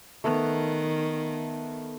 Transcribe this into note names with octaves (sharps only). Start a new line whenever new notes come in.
D#3 A3 B3 B4